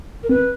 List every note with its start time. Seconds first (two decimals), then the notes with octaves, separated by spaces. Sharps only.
0.23 A#4
0.29 C4 B4